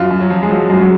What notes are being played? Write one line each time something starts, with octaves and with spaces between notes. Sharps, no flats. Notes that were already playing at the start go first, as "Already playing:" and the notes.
Already playing: F#2 F4
F#2
F#3
F3
G#3
F3 F#3
F#2 G#3
F#3